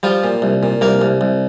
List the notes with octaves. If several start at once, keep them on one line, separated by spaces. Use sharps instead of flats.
F3 G3 F4
A#2
C2
A#2
C2 A#3 A#4
C2
C2